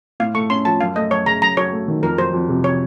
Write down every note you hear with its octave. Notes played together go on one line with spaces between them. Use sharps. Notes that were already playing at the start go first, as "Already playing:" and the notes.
A2 F5
A3 C#6
C#4 C6
F3 A5
F#2 F5
A3 D#5
F#2 C#5
C#3 A#5
F#2 A#5
F#3 C#5
A3
D#3
F2 A#4
F#3 C5
F2
C3
C#5